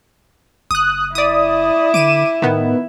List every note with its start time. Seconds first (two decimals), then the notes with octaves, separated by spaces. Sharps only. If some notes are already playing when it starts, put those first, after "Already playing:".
0.71 F#1 D#6 F#6
1.15 E4 D5 D#6
1.94 D3 D6 D#7 E7
2.42 A2 D#3 B3